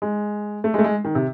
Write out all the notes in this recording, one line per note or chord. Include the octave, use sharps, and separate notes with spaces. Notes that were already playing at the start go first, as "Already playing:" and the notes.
G#3
A3
G#3
A3
G#3
D#3
C3